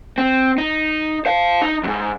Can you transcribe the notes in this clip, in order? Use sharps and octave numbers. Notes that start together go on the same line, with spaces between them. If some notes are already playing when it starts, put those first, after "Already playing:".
C4
D#4
C5 F5
D#4
F2 G#2